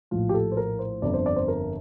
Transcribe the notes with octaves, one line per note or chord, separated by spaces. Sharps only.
A#1 A2 F3 F4
G4
A4
C5
A#4
C5
G1 F2 D3 D5
C5
D5
C5
A#4